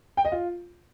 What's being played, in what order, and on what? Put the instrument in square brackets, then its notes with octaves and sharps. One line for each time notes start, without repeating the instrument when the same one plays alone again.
[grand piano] G5
D#5
F4